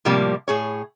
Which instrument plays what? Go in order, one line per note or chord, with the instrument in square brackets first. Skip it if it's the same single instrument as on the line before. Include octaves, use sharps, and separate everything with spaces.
[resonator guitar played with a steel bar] A2 C3 F3 G3 A#3
A2 G#4 C#5